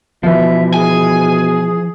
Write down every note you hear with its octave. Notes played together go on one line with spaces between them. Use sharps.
B2 E3 F3 E5
G#4 G#5